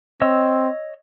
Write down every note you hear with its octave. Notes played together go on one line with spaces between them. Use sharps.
C4 C#5 D#5 E6